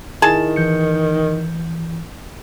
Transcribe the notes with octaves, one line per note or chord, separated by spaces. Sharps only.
D#3 E4 G#4 A5
E3 G6 C#7